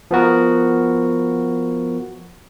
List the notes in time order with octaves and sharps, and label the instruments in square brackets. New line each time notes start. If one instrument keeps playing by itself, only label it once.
[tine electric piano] F3 B3 F#4 A#4